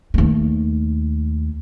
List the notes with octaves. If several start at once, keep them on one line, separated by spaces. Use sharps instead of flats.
D#2 A3